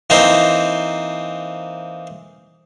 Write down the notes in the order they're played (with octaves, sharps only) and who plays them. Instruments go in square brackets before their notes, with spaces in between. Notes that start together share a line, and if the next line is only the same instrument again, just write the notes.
[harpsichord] E3 A#3 C4 D#4 C5